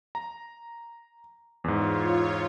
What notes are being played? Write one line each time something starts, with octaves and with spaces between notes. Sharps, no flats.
A#5
E2 G#2 F4 C#5